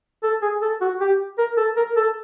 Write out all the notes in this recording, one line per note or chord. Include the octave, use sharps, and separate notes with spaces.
A4
G#4
A4
F#4
G4
A#4
A4
A#4
A4